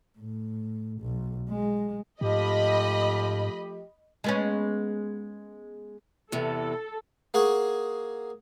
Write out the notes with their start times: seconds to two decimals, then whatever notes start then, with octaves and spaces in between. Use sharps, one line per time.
0.19 A2
1.01 B1
1.49 G#3
2.21 G#2 F3 A3 G4 D#5 B5
4.24 G#3 B3 C#4
6.32 E2 C3 A4
7.34 A#3 G#4 F#5 C#6